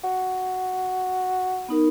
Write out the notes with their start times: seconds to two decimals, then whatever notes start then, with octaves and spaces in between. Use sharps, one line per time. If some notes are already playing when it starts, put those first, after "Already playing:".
0.04 F#4
1.69 B3 D#4 A#4